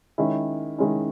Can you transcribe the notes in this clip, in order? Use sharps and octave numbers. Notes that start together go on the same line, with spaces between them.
D#3 G#3 C#4 E4
D#3 G#3 C#4 E4